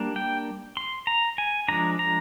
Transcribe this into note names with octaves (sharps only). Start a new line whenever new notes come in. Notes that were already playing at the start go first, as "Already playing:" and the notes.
Already playing: G3 A#3 D4
G5
C6
A#5
G#5
F3 G#3 D4 A#5
A#5